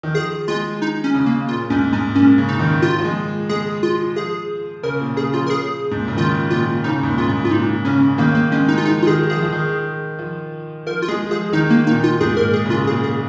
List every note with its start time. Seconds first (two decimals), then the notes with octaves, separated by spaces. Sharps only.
0.03 D#3
0.14 F3 G#4
0.48 G#3 F4
0.82 D#4
1.04 C#4
1.14 C#3
1.26 A#3
1.48 A#2 F4
1.70 G#2 C#4
1.93 G#2 C#4
2.15 A#2 C#4
2.38 C#3
2.48 D#4
2.59 D#3
2.82 F4
2.99 F3
3.05 G#3
3.49 G#3 G#4
3.83 F4
4.16 F3 G#4
4.83 C#3 A#4
5.00 A#2
5.16 C#3 G#4
5.33 F3 F4
5.47 A#4
5.50 G#4
5.91 G#2
6.00 A#2
6.08 C#3
6.17 D#3 F4
6.50 A#2 F4
6.84 C#3 D#4
7.03 G#2
7.07 A#2
7.18 A#2 F4
7.29 G#2
7.45 F4
7.51 A#2 D#4
7.85 C#3 C#4
8.18 D#3 A#3
8.35 A#3
8.52 G#3 C#4
8.68 D#4
8.74 G#3 F4
8.85 F3 D#4
9.03 F4
9.07 D#3 G#4
9.30 F3 G#4
9.42 F3
9.52 D#3
10.19 F3
10.86 F3 A#4
11.02 F4
11.08 G#3 G#4
11.31 F3 G#4
11.53 D#3 D#4
11.70 A#3
11.87 A#2 D#4
12.04 F4
12.20 G#2 G#4
12.37 A#4
12.42 A#2
12.54 G#4
12.65 C#3 F4
12.87 A#2 G#4
13.04 G#4